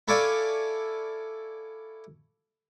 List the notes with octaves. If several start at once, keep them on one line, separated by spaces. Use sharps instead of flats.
E4 A4 C#5 D5 F5 G#5